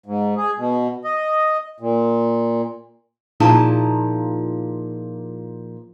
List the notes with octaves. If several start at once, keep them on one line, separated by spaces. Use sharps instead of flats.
G#2
G#4
B2
D#5
A#2
A#2 F3 D#4 E4 G#4 A5